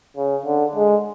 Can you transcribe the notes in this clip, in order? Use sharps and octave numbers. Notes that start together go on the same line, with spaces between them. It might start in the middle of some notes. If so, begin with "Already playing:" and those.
C#3
D3
G#3